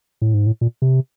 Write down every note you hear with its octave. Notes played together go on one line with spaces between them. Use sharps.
A2
G#2
A2
A#2
C3